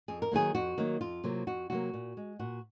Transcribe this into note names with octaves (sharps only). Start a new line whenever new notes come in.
F2 G#4
A#4
D#3 F#3 A#3 G#4
F2 F#4
D#3 F#3 A#3
F2 F4
C3 F#3 A#3
F2 F#4
C3 F#3 A#3 F#4
A#2
G#3
A#2 F#4